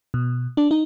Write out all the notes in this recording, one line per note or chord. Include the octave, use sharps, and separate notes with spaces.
B2
D4
D#4